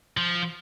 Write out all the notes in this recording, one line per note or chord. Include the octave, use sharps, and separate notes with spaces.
F3